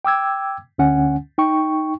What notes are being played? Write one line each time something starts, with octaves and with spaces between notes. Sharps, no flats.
G5 D6 E6 G#6
D2 D3 C#4 F#5 G#5
D#4 G5 C#6